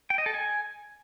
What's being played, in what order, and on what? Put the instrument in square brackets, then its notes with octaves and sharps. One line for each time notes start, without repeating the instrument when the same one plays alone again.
[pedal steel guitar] G5
D#5
A4
G#5